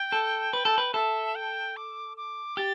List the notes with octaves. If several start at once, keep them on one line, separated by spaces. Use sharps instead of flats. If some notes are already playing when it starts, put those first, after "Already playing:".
Already playing: G5
A4
B4
A4
B4
A4 E5
G5
D6
D6
G4 A6